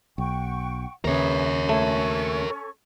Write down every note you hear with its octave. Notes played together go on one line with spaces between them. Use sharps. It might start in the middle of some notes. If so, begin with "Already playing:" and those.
B1 F#5 G5 C#6
D#2 C#3 G#4 A#4 B4 C#5 E5
A3 C#4 A4 C#6